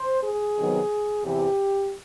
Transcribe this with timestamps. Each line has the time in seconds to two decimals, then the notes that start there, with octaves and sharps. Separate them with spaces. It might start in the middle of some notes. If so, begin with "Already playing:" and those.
Already playing: C5
0.24 G#4
0.57 C3 D#3 F#3 B3
1.23 E2 C3 E3 G4